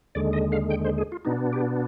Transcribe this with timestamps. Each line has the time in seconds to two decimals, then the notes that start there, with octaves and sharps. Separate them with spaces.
0.15 D#2 D3 G#3 D5
0.33 D#5
0.52 F5
0.70 G5
0.85 C5
0.98 G#4
1.12 F4
1.25 B2 B3 D4 D#4
1.53 G4